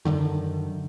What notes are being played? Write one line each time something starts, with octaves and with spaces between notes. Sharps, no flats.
F#2 B2 D3 D#3